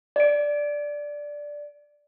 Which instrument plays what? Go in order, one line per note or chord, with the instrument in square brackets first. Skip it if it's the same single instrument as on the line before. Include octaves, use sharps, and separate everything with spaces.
[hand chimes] D5 D7